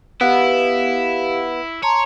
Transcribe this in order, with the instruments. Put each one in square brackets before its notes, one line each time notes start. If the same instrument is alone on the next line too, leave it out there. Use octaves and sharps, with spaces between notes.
[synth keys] B3 [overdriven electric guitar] E4 [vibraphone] G4 F5
[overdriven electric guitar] C#5 [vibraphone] A5 A#5 C6